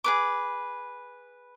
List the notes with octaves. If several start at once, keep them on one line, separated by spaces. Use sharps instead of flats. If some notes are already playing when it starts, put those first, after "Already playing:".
G#4 B4 D6